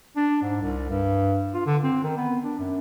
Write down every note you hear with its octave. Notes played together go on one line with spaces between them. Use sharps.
D4
G#2
C2
G2
F4
D3
C4
D#3
B3
D4
F#2